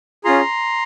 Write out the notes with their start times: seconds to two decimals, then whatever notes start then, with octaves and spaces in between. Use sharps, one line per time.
0.24 C#4 F4 G#4 A#5 C6